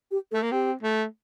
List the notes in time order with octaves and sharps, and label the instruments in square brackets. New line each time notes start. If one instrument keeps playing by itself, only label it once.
[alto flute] G4
[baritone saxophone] A3 [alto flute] A4
[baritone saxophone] A#3
[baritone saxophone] C4 [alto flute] G4
[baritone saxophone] A3